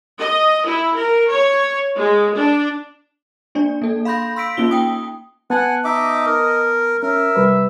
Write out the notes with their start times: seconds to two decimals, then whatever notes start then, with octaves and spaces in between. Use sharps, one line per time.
0.20 D#5
0.66 E4
0.97 A#4
1.31 C#5
1.96 G#3
2.35 D4
3.55 A#3 D4 D5
3.82 A#3 A4
4.05 F5 B5 C6 G6 A#6
4.36 C6 E6 B6 D7
4.57 A#3 C#4 D#4 F4 G7
4.71 G5 D#6
5.50 B3 F#5 G#5 A5
5.85 D#4 D#5 E5 D6
6.26 A#4
7.03 C#4 A#4 E5
7.36 C3 G3 B4